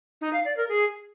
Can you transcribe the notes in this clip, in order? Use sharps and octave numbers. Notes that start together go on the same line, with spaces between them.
D#4
F5
D5
A#4
G#4